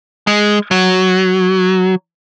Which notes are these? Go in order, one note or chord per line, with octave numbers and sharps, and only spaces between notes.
G#3
F#3